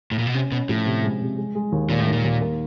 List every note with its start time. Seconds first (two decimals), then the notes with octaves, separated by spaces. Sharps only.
0.12 A2
0.19 A#2
0.27 B2
0.34 C3 C#4
0.52 B2 C#4
0.69 A2 F3
0.86 C3
1.03 G#3
1.21 C3
1.37 G#3
1.55 G#3
1.72 D#2
1.89 D#2 A#2
2.00 A2
2.07 D#3
2.13 A#2
2.24 D#2
2.41 A#3